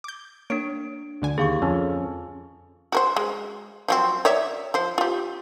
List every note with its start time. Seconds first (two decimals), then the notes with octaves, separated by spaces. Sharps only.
0.04 D6 G6
0.50 A#3 D4 C#5 D7
1.22 D2 D3 G#5
1.38 D#2 G#4 F5 C#6
1.62 F2 C#4 A4
2.92 F#4 A#4 C5
3.16 G#3
3.88 F3 F#3 C4
4.25 C#5 D5 E5
4.74 F3 C5
4.98 F4 G4